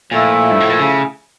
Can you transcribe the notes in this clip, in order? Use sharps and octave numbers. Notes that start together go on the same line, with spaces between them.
A#2 F3 A3 E4
G2
A2
A#2
C#3